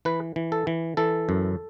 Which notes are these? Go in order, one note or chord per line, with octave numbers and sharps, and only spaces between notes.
E3 B4
E3
A4
E3
E3 A4
F#2